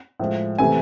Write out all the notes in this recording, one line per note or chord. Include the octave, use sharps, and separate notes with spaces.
A2 F3 G#3
C3 E3 A3 G#5